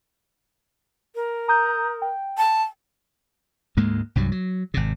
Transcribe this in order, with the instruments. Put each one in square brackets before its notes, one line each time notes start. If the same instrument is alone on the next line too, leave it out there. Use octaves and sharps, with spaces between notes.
[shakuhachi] A#4
[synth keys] A#5 D#6 G6
G5
[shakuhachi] A5
[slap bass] D2 G#2 G#3 A#3
C2 G2 F#3 G3
F#3
G#1 C3